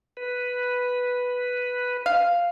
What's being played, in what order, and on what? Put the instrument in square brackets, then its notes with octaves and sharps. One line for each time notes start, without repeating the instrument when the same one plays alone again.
[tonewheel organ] B4
[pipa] F5